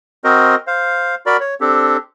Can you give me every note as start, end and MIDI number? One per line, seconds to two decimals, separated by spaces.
0.24 0.55 60
0.24 0.55 66
0.24 0.55 70
0.24 0.55 72
0.24 0.55 75
0.67 1.15 72
0.67 1.15 77
1.26 1.37 66
1.26 1.37 70
1.26 1.37 74
1.26 1.37 83
1.40 1.55 73
1.61 1.97 60
1.61 1.97 62
1.61 1.97 67
1.61 1.97 69